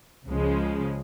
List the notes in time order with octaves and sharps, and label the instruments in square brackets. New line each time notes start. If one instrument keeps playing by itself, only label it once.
[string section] C#2 C#3 F3 G#3